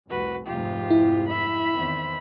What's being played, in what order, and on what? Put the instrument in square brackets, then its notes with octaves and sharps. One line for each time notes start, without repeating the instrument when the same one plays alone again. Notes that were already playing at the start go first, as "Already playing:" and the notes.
[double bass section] F1 C2 [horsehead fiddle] F#4 B4
[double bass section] F1 G#2 [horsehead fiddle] F4 G4
[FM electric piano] E4
[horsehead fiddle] E5 B5
[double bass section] E2 D#3 C4